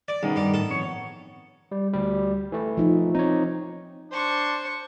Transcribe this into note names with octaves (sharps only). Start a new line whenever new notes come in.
D5 A6
B1 D#3 E3 F#3 B3 C#4 G#4
G2 G3
A2 A4
F3 C4 C#5
G3
D2 G3
E3 A3
F3 D#4
C4 D#4 C#5
D4 C5 C#6